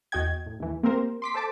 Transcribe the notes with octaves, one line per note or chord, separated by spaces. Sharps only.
E2 F#4 D#5 G5 G#6
A2
D#2 E3
A#3 C4 G4 A#4 C5
C6 D6 B6
A4 C5 A5 D6